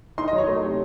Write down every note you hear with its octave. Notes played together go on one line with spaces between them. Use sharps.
D#4 C6
D#5
F#3
C#5
A3
C3